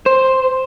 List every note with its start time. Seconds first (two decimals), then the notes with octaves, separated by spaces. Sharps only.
0.06 C5